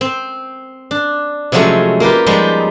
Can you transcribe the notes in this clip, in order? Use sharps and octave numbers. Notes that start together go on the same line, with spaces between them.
C4
D4
C3 F3 F#3 G#3 A3 C#4
A#3 F4 G4 B4
F3 G3 G#3 D#4 G4